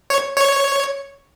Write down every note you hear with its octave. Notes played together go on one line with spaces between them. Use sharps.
C#5
C#5